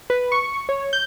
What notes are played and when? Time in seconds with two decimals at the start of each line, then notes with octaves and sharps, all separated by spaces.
0.10 B4
0.32 C#6
0.69 C#5
0.93 G6